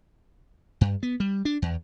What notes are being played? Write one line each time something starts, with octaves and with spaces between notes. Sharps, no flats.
G2
B3
G3
D4
E2